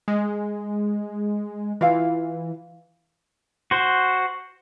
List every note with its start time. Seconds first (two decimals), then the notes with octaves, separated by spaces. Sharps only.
0.08 G#3
1.81 E3 F4 F5
3.71 F#4 C5